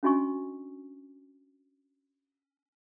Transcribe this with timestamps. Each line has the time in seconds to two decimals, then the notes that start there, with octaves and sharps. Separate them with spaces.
0.03 C#4 D4 F#4 D#5 G#5 C#6